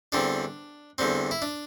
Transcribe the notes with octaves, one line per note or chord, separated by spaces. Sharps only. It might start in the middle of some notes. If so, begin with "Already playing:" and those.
E2 D3 G3 C4 D4
E2 D3 G3 C4
E4
D4